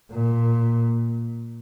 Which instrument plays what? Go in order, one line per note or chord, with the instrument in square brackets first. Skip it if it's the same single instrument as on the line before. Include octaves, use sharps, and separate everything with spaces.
[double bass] A#2